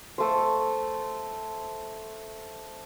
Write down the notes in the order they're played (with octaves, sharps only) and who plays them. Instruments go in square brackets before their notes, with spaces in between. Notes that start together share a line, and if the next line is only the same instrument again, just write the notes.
[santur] A3 C5